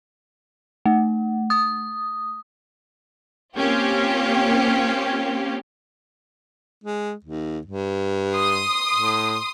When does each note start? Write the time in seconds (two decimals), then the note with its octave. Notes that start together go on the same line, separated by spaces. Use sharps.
0.86 A3
1.50 D#6
3.57 A#3 C4 C#4 F4 G4
6.84 G#3
7.25 D#2
7.66 G2
8.33 C6 D#6
8.95 A2